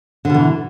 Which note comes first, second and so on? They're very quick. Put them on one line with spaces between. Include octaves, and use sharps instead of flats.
D3 B2 E3